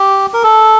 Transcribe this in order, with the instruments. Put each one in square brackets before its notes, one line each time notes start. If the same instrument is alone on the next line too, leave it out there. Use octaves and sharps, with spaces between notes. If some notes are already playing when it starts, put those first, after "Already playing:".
Already playing: [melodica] G4
A#4
A4